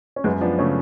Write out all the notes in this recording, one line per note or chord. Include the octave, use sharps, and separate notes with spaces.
C#4
F#2 G#3 B3
F3 B3 D4
C#3 A3 C#4